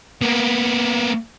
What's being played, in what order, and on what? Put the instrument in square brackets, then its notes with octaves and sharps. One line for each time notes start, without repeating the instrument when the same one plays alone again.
[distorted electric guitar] A#3 B3